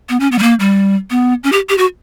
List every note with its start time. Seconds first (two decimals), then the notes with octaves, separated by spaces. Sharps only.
0.09 B3
0.20 C#4
0.32 B3
0.38 G3
0.42 A#3
0.60 G3
1.10 B3
1.44 C#4
1.52 G4
1.69 G4
1.78 F#4